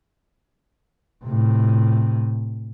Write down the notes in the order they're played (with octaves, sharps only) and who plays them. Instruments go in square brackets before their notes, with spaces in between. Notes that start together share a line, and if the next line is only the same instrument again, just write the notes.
[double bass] A2 C3